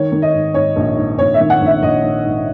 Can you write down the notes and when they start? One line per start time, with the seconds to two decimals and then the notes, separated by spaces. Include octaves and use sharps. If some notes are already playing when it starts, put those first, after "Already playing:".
Already playing: D#3 C#5
0.12 D#3
0.22 D#5
0.33 G#2
0.54 G#2 C#5
0.76 A#1
0.96 G#2
1.18 A#1 C#5
1.34 E5
1.40 D#3
1.50 F#5
1.61 A#1
1.66 E5
1.82 A#1 D#5
2.03 A#1
2.25 G#2